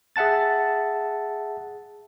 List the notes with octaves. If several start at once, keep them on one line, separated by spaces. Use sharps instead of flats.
G#4 E5 F#5 A5 A6